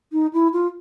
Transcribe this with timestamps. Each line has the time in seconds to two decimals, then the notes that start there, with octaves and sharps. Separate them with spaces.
0.12 D#4
0.33 E4
0.53 F4